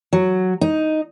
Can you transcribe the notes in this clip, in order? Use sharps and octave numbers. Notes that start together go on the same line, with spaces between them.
F#3
D#4